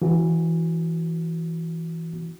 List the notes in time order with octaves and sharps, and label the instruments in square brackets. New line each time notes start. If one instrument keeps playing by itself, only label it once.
[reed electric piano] E3 F#4